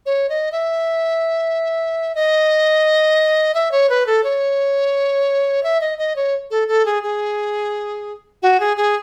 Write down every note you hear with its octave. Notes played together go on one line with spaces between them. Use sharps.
C#5
D#5
E5
D#5
E5
C#5
B4
A4
C#5
E5
D#5
D#5
C#5
A4
A4
G#4
G#4
F#4
G#4
G#4